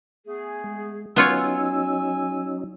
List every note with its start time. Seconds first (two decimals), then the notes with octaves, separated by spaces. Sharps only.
0.26 A3 B3 G#4
0.64 G#3
1.16 F#3 B3 C#4 D#4 F4 C#5 G#5 E6